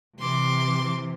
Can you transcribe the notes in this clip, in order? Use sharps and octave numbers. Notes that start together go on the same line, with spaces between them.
C3 E3 C6 D6